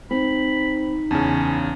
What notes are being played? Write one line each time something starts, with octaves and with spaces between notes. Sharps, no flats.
C4 D#4 B5
E2 C#3 C#4 A5